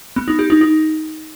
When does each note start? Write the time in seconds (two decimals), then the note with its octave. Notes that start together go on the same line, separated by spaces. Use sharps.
0.16 B3
0.28 D#4
0.39 G4
0.50 D#4
0.61 D#4